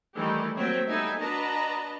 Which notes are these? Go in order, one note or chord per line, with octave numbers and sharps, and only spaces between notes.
D#3 E3 G3 A3 G4 A4
F#3 A3 A#3 C4 C#5 E5
G3 B3 D#4 A4 E5 G#5
D4 F#4 B4 D#5 A5 A#5